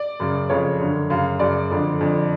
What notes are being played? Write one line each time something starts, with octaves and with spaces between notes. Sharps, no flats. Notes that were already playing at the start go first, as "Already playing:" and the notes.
Already playing: D5
F#2 C#3
F2 C#3 C#5
F#2 D3
F#2 C#3 F5
F#2 C#3 D5
F2 D3
F2 D3